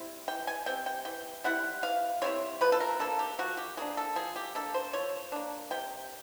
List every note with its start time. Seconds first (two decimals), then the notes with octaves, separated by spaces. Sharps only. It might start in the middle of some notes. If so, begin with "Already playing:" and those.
Already playing: G3 C4 E4
0.28 E3 G5
0.47 G#5
0.66 G3 C4 G5
0.86 G5
1.05 E3 G5
1.44 G3 C4 E4 F#5
1.83 E3 F5
2.22 G3 C4 E4 C#5
2.61 F3 B4
2.72 A4
2.80 A#4
2.99 A#3 D4 A4
3.19 G4
3.39 F3 F#4
3.57 G4
3.77 A#3 D4 G#4
3.97 A4
4.16 F3 G#4
4.36 G4
4.55 A#3 D4 A4
4.74 C5
4.93 F3 C#5
5.32 A#3 D4
5.71 C3 G5